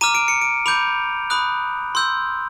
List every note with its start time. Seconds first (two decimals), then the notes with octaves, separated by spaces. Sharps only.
0.01 A#5 D6 F6 D#7
0.15 D7
0.28 C#7
0.41 D7
0.66 B5 D6 G6 F7
1.30 B5 D#6 F#6
1.95 C6 E6 G6